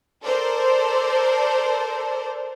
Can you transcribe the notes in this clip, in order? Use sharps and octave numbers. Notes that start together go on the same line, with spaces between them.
A4 A#4 C5 D5